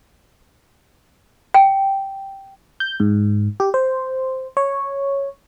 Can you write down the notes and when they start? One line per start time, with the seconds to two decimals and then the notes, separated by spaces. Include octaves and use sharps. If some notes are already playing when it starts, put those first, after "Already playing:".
1.54 G5
2.80 G6
3.00 G#2
3.60 G4
3.74 C5
4.57 C#5